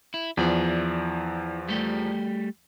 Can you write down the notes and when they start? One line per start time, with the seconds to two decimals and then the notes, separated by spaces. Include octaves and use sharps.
0.14 E4
0.37 E2 F3 E4 D5
1.69 G3 A3 G4